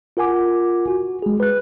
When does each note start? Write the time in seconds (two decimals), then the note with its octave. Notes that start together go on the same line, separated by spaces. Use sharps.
0.17 F4 A#4 F#5 G#5 D6
0.88 F#4
1.22 G#3 G#4
1.40 B4 F#6